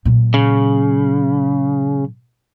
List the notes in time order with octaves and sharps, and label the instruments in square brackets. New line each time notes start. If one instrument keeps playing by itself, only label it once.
[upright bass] A#2 F#3
[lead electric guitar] C#3